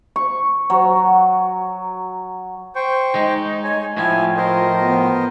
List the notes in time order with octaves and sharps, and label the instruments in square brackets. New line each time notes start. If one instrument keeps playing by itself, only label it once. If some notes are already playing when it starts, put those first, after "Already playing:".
[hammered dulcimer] C#6
F#3
[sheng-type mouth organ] C5 G5 C#6
[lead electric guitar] G#3 [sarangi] D#4
[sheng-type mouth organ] C#5 G#5
[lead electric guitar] A2 F3 [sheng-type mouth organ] E4 G#5 [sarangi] F4
[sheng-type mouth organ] A#4 C5 D#5
[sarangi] B3